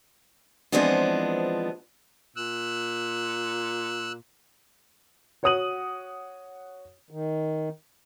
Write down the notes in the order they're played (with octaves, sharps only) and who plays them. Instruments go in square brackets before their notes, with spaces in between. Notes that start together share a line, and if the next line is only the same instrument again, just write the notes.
[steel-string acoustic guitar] E3 F3 G#3 B3 C4 D4
[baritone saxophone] A#2 [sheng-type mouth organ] E6 F#6
[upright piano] F#4 C#5 F#5 D#6 D#7 F#7
[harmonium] D#3